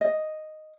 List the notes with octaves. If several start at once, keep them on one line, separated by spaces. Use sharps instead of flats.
D#5